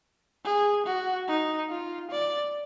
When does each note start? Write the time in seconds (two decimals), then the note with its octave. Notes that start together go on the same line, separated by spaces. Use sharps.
0.45 G#4
0.86 F#4
1.28 D#4
1.70 F4
2.11 D5